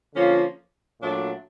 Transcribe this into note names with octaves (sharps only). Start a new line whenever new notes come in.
D3 F3 A#3 C#4 F4
A#2 F#3 A3 D4